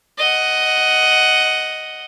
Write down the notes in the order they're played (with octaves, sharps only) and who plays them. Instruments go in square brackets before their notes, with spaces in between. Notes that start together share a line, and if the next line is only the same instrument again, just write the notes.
[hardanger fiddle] D#5 F#5